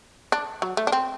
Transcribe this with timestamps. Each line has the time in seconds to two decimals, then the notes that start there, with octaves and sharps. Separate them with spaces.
0.32 D4
0.62 F#3
0.77 A3
0.87 D4
0.92 C4